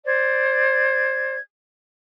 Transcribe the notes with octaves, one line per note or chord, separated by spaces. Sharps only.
C5 D5 G#6